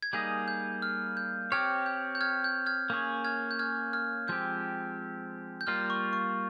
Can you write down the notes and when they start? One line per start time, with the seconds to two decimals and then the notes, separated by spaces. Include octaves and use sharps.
0.03 G#6
0.13 G3 A#3 D#4 G#4 D#5 G6
0.48 G6
0.82 F6
1.17 G6
1.52 C4 G4 C#5 F6 G#6
1.86 G6
2.15 G6
2.21 F6 G#6
2.44 G6
2.66 F6 G#6
2.90 A#3 C#4 G#4 C#5 G6
3.25 F6 G#6
3.51 G6
3.59 F6 G#6
3.93 F6 G#6
4.28 F3 G#3 C4 G4 G6
5.61 G6
5.67 G3 A#3 F4 F6
5.90 C#6
6.13 C#6